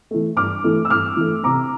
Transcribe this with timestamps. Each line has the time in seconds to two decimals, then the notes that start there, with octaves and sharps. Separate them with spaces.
0.11 E3 A3
0.37 G2 D6 F6
0.64 E3 A3
0.85 E6
0.90 G2 D6 F6
1.17 E3 A3
1.44 C3 A#5 D6